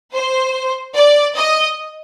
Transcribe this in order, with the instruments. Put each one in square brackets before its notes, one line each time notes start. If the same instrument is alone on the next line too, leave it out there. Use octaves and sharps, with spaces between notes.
[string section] C5
D5
D#5